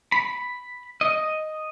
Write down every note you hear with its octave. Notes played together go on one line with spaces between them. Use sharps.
B5
D#5